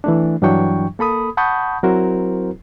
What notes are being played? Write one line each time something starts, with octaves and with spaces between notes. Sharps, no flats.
E3 A3 D4
G2 E3 F#3 D4 G5 C#6
A#3 A4 B5 D#6
F#5 A5 B5 C#6 D#6 G6
F#3 C4 E4 F#4 A#4 C5